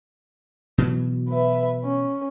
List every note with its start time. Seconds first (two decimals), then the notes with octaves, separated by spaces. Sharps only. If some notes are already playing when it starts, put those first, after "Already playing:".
0.78 B2 E3 F#3
1.29 B4 E5
1.84 C#4